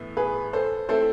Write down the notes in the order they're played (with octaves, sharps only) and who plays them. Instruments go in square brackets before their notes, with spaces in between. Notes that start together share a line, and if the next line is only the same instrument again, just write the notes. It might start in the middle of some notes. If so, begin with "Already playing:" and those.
Already playing: [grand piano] A2 E3 B3 E4
[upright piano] G#4 B4
A4 C5
[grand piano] A3 C4 E4 [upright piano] A4 C5